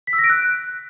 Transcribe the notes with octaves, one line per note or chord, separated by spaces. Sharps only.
B6
E6
A#6
D7
F#6